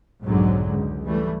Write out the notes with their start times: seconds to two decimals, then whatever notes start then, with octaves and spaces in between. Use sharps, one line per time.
0.24 B1 F2 G#2 D3 F#3
0.69 C#2
1.06 E3 G3 A3